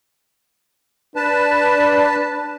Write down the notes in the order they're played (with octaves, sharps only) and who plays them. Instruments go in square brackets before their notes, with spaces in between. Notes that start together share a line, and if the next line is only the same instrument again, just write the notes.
[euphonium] D4 [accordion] B4 A5